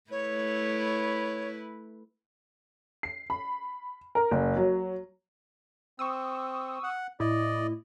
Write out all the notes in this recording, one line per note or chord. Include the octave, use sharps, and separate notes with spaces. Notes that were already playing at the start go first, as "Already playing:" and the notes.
A3 E4 B4 C#5
C7
B5
A#4
F#1
F#3
C4 C#6 D#6 E6
F#5
A2 E4 D5 D#5